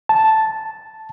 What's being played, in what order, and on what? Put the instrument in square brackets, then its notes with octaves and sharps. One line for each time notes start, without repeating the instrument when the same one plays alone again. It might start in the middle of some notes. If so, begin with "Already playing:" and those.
[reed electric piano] A5